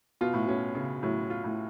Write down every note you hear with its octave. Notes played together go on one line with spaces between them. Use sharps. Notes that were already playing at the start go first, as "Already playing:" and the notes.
B2 F4
A2
B2 C#4
C#3
A2 F#3
F4
A2